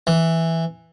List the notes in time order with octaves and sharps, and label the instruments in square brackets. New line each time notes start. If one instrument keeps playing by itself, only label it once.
[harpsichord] E3